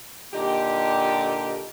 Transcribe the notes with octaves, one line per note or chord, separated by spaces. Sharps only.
A#2 D3 D#4 G4